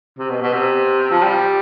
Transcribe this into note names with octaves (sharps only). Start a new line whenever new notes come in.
C3
B2
B2
C3
F3
G3